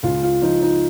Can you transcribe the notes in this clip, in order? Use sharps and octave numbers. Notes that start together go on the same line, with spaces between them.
C#2 F4
F4
F3 D#4
D#4